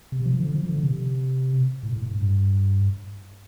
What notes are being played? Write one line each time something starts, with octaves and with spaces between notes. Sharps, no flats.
C3
F3
D3
F3
D3
C3
A2
A2
G2